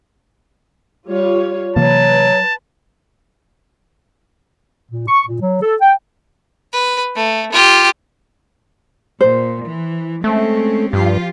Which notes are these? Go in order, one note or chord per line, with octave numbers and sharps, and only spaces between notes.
G3 F4 C#5
C3 E3 F#3 A#3 B4 A5
A#2
C#6
A#2
F#3
A4
G5
B4
A3
F4 G4
A#2 C5
E3
G#3 A3 C4 C#4
G2 F3 F4 G4